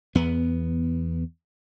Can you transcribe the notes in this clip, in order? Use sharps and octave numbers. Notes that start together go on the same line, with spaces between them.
E2 B3